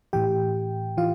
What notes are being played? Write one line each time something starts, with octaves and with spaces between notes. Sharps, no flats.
A2 E3 G4 G5
E3 F4 F5